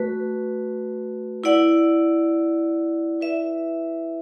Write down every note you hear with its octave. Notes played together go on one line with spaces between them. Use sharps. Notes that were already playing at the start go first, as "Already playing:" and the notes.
Already playing: A3 F#4 B4
E4 D5 F#5
E4 B4 E5